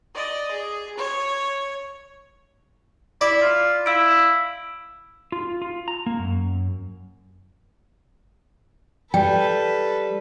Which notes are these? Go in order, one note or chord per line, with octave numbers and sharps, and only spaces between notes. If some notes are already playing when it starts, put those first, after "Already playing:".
D5 D#5
G#4
C#5
E4 D5
F4
E4 F5 E6 D7
F4
F4
A#5
A#3
F#2
G3 A4 B4 G5